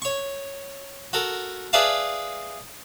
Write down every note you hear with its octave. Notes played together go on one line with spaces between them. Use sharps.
C#5 C#6
F#4 A4 A#4
G#4 B4 D5 E5 F5 A5